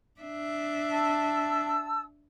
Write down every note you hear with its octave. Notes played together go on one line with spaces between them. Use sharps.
D4 E5
A5 E6